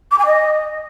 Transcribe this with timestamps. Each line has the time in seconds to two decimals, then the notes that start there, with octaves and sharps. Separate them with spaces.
0.11 D6
0.18 G#5
0.26 D#5